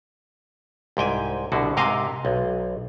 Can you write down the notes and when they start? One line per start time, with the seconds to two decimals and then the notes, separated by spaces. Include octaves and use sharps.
0.97 C2 G#2 G5 G#5
1.52 C2 B2 D3 F#4
1.77 G#2 C3 A#4 D#5 F5
2.25 B1